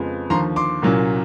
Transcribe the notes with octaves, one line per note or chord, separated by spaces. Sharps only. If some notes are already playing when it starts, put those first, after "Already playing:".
Already playing: F2 C#3 F3 G#3 B3
D#2 D3 F3 A#5 C6
C6 D6
C2 A#2 F#3 A#3 C#4